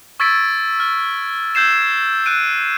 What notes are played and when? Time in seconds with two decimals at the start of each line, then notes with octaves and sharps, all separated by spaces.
0.20 C#6 E6 G#6 A6 B6 D7
0.80 F6
1.55 E6 G6 G#6 C7 E7
1.69 G#6
2.26 F#6 D7 D#7